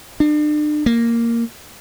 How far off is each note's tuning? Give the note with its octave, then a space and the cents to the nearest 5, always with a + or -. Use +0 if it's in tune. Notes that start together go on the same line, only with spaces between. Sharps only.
D4 +40
A#3 -5